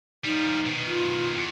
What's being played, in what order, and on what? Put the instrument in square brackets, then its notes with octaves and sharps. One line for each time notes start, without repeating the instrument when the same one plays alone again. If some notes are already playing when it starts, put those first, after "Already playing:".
[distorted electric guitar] F3 G3 [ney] D#4
[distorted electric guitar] B2 D#3
[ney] F4
[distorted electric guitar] E2